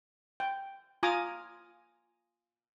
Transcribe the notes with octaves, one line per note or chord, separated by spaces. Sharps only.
G5
F4 G#5 A#5 D6 D#6